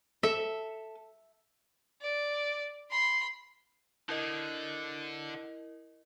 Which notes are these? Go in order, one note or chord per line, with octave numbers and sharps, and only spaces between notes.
A4 E5
D5
B5 C6
D3 E4 A#4 D#5